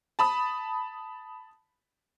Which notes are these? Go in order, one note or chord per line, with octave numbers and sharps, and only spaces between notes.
A5 B5 D#6